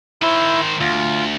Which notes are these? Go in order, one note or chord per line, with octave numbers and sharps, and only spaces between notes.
D#3 E4 C5
D2 F4